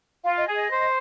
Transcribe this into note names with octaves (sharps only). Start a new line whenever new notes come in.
F4 F5
D#5
G#4
D#5
C5